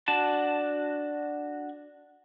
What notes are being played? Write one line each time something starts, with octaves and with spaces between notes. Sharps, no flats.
D4 F#4 A5